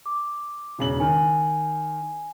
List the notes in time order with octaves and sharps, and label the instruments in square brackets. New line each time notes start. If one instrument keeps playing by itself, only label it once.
[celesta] D6
[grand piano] E1 C#3 F#7
[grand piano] D#3 [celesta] G#5